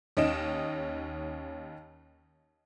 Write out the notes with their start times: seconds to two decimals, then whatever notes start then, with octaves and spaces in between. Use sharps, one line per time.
0.17 D#2 C#4 D#4 D#5 D7 E7